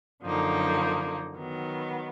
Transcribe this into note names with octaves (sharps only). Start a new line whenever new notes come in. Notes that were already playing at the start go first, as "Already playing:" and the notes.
F#2 D3 F3 A#3 D#4
D#3 F#3 B3